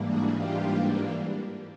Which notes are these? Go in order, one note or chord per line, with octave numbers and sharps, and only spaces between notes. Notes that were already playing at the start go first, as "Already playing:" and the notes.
Already playing: G#2 E3 G3 A#3 D4
F#4 G#4
F4 G4